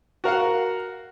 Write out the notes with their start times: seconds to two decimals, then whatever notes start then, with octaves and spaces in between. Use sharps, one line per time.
0.24 F#4 A#4 F5 F#5